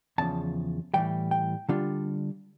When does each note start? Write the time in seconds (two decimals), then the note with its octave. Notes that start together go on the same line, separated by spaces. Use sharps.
0.18 E2 C#3 F3 A5
0.94 A2 E3 G3 G5
1.31 G5
1.69 D3 G3 D4 F4